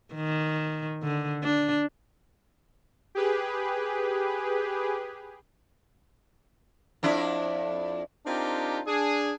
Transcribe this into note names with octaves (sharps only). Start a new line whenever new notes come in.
D#3
D3
D4
G4 G#4 B4
F2 D4 E4
C4 D4 D#4 F4 G4 A#4
D4 G#4